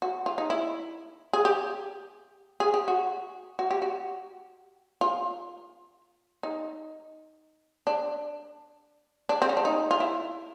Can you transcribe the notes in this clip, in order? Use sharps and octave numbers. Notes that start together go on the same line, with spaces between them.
F#4
F4
D#4
E4
G#4
G4
G#4
G4
F#4
F#4
G4
F#4
F4
D#4
D4
D4
C4
C#4
D4
D#4
F4
E4